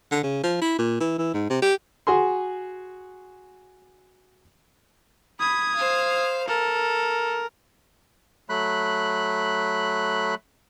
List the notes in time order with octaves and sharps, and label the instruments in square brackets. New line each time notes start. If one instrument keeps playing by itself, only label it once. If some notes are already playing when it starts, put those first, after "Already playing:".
[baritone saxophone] D3
C#3
F3
E4
A#2
E3
E3
G#2
C3
G4
[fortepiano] F#4 G#4 C6
[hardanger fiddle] B5 [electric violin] D#6 G#6
[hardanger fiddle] C5 F5
[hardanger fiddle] A4 [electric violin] A#4
[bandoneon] F#3 A3 B5 F#6